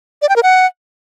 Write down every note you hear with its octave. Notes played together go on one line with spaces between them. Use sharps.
D5
G5
A#4
F#5